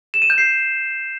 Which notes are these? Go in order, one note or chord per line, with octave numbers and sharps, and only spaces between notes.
E7
D#7
G6
C7